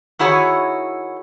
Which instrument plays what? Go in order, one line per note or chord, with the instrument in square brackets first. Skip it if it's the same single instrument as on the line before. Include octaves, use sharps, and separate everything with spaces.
[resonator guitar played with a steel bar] D#3 E4 F#4 G#4 C#5